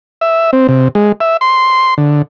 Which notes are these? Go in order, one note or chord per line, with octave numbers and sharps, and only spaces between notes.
E5
C4
C3
G#3
E5
C6
D3